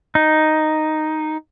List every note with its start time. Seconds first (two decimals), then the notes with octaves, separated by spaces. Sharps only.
0.15 D#4